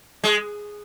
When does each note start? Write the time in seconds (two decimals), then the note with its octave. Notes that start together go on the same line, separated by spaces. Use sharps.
0.24 G#3